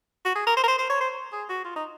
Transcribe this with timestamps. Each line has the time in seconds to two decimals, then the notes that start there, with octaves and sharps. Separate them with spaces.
0.25 F#4
0.36 G#4
0.47 A#4
0.57 C5
0.64 A#4
0.68 C5
0.79 C5
0.90 C#5
1.01 C5
1.32 G#4
1.50 F#4
1.65 F4
1.76 D#4